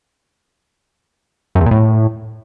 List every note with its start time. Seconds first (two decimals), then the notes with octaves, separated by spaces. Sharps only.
1.55 F#2
1.61 E2
1.66 A#2
1.71 A2